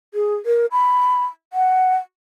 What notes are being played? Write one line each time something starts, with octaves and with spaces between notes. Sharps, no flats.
G#4
A#4
B5
F#5